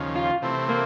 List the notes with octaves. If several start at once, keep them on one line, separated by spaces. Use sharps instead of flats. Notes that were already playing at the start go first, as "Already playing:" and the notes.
Already playing: D#2 C#3 F3
F4
C3 E3 A3 C4
A#3